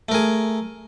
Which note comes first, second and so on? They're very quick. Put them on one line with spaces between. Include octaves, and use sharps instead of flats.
A3 A#4 G#4